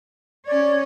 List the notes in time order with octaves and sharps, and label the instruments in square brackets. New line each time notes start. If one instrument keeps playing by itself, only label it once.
[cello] C#4 C#5 [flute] D5